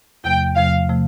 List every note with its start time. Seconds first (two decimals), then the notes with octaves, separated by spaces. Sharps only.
0.24 E2 C3 F3 A3 G5
0.56 E2 C3 F3 A3 F5
0.89 C3 F3 A3